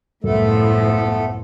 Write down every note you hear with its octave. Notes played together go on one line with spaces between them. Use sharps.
C2 F#2 A2 F3 A3 B3 A4